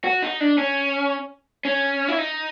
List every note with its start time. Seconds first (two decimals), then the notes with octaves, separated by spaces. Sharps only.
0.04 F#4
0.22 D#4
0.40 D4
0.58 C#4
1.65 C#4
2.08 E4
2.18 D#4